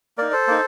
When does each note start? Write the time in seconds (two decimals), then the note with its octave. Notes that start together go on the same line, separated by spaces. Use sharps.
0.18 A#3 D#4 A#4 D5
0.32 A4 C5
0.47 A#3 D#4